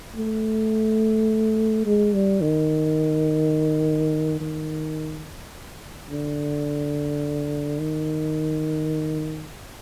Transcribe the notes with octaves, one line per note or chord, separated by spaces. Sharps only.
A3
G#3
G3
D#3
D#3
D3
D#3